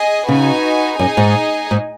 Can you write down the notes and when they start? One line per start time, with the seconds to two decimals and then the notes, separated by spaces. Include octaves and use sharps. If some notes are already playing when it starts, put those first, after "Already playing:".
Already playing: G#4 D#5 G#5
0.28 C#3 D#4 F#4 B4 G#5
0.99 F#2 D#4 G#4 D#5 G#5
1.17 G#2
1.71 G#2